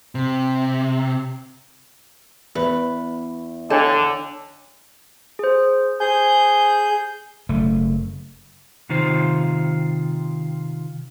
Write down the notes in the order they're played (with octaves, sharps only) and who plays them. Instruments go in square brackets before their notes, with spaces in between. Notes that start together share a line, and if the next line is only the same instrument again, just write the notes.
[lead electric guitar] C3
[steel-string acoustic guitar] E2 [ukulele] B4
[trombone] D3 [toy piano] D4 C#5 D#5 [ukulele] A4
[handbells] G#4 C5
[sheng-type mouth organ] G#4 G6 [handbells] C5 G#5
[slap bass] F#1 A3
[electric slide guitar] C3 D#3 D#4 F4 C5